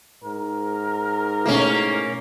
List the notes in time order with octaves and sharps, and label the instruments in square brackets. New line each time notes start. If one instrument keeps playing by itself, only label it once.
[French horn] G#2 [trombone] A#4
[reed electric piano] B2 A3 E4 [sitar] A#3 C#4